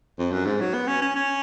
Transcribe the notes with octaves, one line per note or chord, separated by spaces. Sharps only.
F2
F#2
G#2
F#3
B3
C#4
C#4
C#4